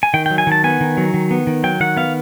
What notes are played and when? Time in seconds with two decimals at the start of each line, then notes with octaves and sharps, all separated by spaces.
0.03 G#5
0.14 D#3 G5
0.26 F#3 G5
0.38 G#5
0.47 D#3 A5
0.64 B3 G#5
0.81 D#3
0.97 F#3
1.14 D#3
1.31 B3
1.47 D#3
1.63 F#3 G5
1.80 D#3 F#5
1.97 B3 F5